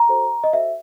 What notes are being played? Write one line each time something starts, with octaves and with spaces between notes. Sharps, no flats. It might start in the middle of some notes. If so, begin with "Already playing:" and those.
Already playing: A#5
F#4 A4 C5
D#5
F#4 A4 C5 E5